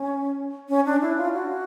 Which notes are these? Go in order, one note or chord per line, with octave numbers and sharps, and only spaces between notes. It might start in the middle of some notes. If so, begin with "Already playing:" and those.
Already playing: C#4
C#4
D4
E4
F4
F#4